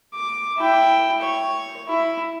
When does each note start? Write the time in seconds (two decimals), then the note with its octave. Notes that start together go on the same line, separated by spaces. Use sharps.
0.14 D6
0.57 E4 G5
1.22 C#5
1.88 E4